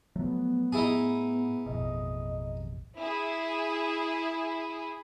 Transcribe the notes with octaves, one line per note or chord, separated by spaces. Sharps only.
F3 F#3 A3 B3
A2 D#4 E4 G#4
A1 F2 B2 D#5
E4 G#4